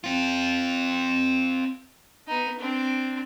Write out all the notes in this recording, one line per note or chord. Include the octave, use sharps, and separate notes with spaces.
C4 F4
B3 D#4
C4 D4